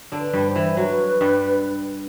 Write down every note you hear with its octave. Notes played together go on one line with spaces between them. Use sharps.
D3 D4
B4
G2 G3
C5
E3
F#3 B4
G2 G3